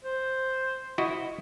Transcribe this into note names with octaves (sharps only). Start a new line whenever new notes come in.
C5
E4 F#4 D#5